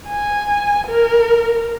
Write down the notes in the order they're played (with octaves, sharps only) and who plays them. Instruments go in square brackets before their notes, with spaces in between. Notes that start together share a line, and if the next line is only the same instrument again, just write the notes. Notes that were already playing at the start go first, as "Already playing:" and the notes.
[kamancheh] G#5
A#4